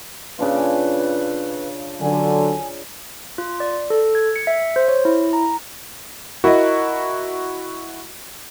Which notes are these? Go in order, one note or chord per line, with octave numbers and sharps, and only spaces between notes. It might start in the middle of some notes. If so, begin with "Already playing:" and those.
C#3 D4 F4 B4
D3 F#3 G#5
F4
D5
A4
G#6
C#7
E5
C5
C#5
E4
A#5
E4 F#4 A#4 D#5